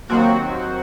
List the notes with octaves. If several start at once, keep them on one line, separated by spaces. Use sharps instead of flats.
D#2 D#3 F#3 A#3 C4 F#4